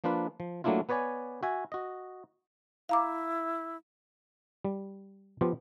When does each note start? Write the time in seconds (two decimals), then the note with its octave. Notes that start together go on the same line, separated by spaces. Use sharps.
0.04 F3 A#3 D4 F4 B4
0.40 F3
0.64 F#3 A3 A#3 D4 E4 F4
0.89 B3 B4 C#5 D5 G#5
1.43 F#4 E5 G#5
1.72 F#4 D#5
2.89 E4 F5 A#5 D6
4.65 G3
5.41 F3 B3 F4 G4